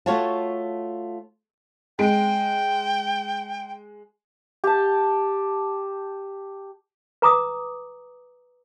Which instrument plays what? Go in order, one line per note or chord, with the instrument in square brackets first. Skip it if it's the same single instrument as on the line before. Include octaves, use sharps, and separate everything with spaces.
[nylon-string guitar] A3 F4 F#4 C#5 F5 A5
[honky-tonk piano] G#3 D7 [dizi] G5
[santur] G4 A5
[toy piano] B4 A#5 D6 D#6